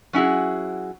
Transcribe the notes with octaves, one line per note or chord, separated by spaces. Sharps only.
F#3 C#4 E4 F#4 G#4